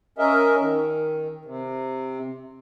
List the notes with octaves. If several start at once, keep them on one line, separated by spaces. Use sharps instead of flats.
C#4 A#4 D#5 E5
D#3
C3